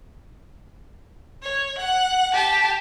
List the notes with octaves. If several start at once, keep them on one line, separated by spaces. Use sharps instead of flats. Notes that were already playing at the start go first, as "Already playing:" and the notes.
C#5
F#5
G4 A5